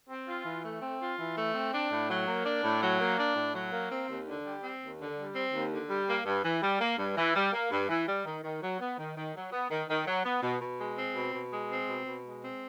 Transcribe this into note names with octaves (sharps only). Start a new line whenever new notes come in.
C4
F4
E3
A3
C4
F4
E3
A3
C4
D4
A2
F#3
A#3
D4
A2
F#3
A#3
D4
A2
F#3
A#3
C4
D#2
D3
G3
C4
D#2
D3
G3
C4
D#2
D3
G3
A#3
G2
E3
G3
A#3
G2
E3
G3
A#3
G2
E3
G3
D#3
D#3
F#3
B3
D#3
D#3
F#3
B3
D#3
D#3
F#3
B3
B2
B2
G#3
C4
B2
B2
G#3
C4
B2
B2
G#3
C4